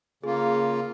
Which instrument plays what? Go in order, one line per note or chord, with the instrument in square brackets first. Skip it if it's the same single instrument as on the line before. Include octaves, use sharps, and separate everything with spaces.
[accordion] C#3 A#3 F4 [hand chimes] G#4